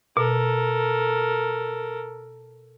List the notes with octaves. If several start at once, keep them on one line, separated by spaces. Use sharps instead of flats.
B2 A4 A#4